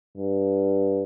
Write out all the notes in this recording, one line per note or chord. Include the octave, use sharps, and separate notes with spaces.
G2